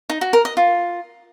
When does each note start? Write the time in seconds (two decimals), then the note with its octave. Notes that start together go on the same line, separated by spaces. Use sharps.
0.10 D#4
0.21 F#4
0.33 A#4
0.45 D#5
0.57 F4